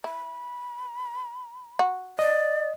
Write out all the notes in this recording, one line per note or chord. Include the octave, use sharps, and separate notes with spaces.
E4 B5
F#4
D5 D#5